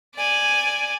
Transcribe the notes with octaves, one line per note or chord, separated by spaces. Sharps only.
D5 G#5